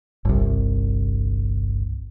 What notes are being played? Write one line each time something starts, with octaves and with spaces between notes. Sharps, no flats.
G1 C2